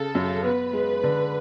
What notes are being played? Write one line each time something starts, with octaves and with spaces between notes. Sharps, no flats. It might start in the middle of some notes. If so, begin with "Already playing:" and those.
Already playing: C#3 A4
F#2
B3 B4
G#3
D3